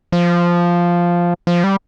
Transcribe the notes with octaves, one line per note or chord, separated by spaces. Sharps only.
F3
F3
G3